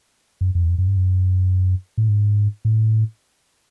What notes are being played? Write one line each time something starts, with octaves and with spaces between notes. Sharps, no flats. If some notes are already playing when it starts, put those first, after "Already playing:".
F#2
F2
E2
F2
F#2
G2
F#2
A2
G#2
A2